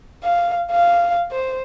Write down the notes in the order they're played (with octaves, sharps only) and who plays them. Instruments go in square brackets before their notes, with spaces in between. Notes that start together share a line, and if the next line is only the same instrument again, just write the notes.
[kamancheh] F5
F5
C5